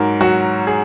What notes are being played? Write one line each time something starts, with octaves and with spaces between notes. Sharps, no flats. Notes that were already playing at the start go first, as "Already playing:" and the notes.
Already playing: G#2 F#3 A#4
F#3 F#4
G#4